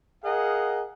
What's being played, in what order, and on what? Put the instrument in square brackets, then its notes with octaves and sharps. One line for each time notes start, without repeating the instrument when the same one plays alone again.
[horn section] G#4 A#4 D#5 F5 F#5